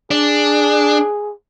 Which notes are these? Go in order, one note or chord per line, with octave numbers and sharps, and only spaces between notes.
D4 G#4